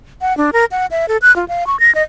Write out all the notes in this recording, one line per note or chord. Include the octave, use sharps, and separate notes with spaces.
F#5
D4
A#4
F#5
E5
A4
F#6
F4
F5
C#6
A#6
D#5